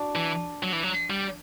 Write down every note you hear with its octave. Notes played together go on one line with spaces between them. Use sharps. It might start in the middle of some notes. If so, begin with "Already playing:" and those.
Already playing: D4 F#4
E3
F#3
E3
F#3
G3